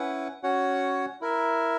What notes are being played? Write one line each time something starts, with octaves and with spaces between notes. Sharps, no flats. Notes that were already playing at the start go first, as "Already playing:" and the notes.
Already playing: C#4 E4 B4 F#5
C#4 F#4 C#5 F#5
E4 A#4 E5